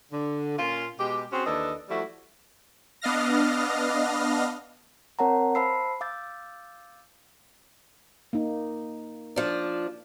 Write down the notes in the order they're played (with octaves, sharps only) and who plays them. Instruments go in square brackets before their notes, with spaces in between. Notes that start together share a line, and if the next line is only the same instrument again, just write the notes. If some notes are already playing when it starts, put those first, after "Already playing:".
[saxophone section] D3
A#2 C#4 F4
B2 G#3 G4
C4 C#4 F#4 G#4 C5
D#2 E3 D4 A4 D#5
F3 G3 A3 E4 F#4
[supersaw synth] B3 D4 D#5 F5 F6 A#6
[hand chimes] C4 A#4 C#5 F#5 A5 A#5
C5 F5 A5 B5 E6 C7
F5 D6 E6 G6 A6
[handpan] A#3 D#4
[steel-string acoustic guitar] F3 D4